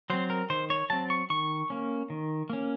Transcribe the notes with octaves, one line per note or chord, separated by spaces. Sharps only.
F#3 C4 C5
A#4
D#3 C5
C#5
F#3 C4 A5
C#6
D#3 C#6
A#3 C#4
D#3
A#3 C#4